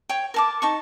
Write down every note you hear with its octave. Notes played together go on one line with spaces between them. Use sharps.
C#5 G5
A#4 A5 D6
D#4 A5 C#6